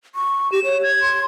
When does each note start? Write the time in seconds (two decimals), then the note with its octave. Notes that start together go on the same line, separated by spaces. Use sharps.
0.15 C#6
0.52 G4 E7
0.65 C#5
0.83 G#6
1.01 C6